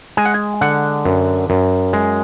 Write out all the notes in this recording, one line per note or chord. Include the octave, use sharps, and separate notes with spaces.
G#3 G#5
F#5
G#5
D3 F#5
F#2
F#2
G#3